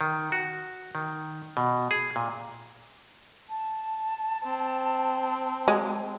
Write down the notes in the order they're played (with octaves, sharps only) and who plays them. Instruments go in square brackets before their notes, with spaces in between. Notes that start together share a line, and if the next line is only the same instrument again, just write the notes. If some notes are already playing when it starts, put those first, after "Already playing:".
[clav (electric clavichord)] D#3
F#4
D#3
B2
G#4
A#2
[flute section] A5
[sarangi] C4
[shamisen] G#3